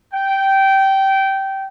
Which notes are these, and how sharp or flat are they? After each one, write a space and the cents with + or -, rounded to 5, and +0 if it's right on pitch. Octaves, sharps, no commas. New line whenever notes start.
G5 -15